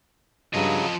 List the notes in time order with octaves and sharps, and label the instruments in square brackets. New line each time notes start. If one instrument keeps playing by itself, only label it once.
[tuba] G2 [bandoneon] C#3 F#3 [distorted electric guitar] F3 D#5